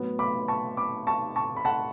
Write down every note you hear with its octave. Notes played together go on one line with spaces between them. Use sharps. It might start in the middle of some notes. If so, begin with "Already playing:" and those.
Already playing: A2 F#3 B3
B5 D6
A5 C#6
B5 D6
A5 C#6
A5 C#6
B5
F#5 A5